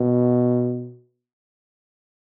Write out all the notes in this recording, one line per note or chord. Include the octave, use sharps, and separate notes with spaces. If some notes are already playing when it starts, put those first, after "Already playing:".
Already playing: B2